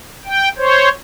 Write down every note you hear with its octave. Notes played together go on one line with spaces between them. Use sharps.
G5
C5 C#5